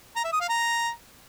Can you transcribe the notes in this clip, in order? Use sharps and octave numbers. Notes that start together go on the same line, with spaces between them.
A#5
E5
D#6
F5
A#5